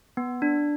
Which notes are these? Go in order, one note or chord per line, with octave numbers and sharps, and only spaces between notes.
B3
D4